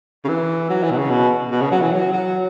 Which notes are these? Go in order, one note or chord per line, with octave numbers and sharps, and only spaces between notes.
C#3
E3
F#3
E3
B2
C#3
B2
B2
C#3
F#3
E3
F#3
F#3